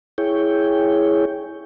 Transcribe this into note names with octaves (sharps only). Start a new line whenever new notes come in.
E4 G#4 C#5 G5